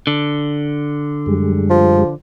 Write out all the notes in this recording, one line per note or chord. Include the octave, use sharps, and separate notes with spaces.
D3
F#2 G3 G#3
F3